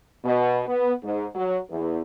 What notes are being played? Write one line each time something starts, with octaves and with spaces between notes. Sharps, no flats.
B2
B3
G#2
F#3
E2